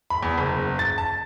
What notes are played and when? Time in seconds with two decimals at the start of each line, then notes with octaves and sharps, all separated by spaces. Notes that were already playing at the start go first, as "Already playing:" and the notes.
0.10 B5
0.23 E2
0.38 F#1
0.79 A6
0.98 A5